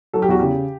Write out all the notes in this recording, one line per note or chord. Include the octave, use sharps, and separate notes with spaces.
F#3 A4
G4
E2 F#4
C#3 G4